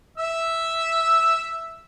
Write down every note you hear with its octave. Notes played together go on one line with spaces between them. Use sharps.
E5 E6